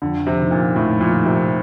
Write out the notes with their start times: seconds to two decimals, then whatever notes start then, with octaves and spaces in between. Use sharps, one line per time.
0.02 F2 D3
0.27 C3
0.40 D#3 A#3 D#4 G4
0.51 A#2
0.76 F2 A2
1.01 A#2
1.12 D#3 A#3 D#4 G4
1.26 C3